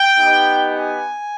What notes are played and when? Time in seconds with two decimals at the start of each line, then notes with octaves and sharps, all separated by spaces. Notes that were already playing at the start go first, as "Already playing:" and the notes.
Already playing: G5
0.17 B3 D#4 G4
0.69 G#5